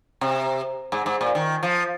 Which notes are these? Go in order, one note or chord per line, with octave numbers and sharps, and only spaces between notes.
C3
G#2
G#2
A#2
D#3
F3